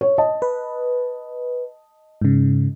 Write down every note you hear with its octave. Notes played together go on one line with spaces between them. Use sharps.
C#5
D#5 A5
B4
G#2 C#3